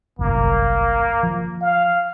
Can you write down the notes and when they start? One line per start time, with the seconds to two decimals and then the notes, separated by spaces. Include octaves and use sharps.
0.19 G1 C2 F#2 A#3
1.23 F3
1.62 F5